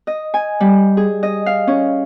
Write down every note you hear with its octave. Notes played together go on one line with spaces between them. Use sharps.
D#5
G#5
G3
G#4
D#5
F5
C#4